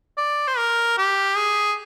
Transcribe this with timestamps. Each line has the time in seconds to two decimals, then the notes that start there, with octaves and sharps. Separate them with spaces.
0.18 D5
0.48 C5
0.57 A#4
0.98 G4
1.37 G#4